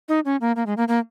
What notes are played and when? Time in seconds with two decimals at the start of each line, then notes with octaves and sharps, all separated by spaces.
0.09 D#4
0.25 C#4
0.41 A#3
0.56 A#3
0.66 G#3
0.77 A#3
0.88 A#3